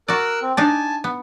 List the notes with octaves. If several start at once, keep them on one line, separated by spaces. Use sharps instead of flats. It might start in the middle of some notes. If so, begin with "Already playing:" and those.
F#4 A#4 D5 E6 F#6
C4
D4 D#4 D5 G#5 A5
B3